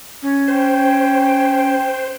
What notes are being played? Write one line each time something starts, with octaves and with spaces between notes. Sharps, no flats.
C#4
C5 G5